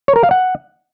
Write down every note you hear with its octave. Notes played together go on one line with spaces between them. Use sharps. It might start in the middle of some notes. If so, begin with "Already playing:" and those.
C#5
A#4
F5
F#5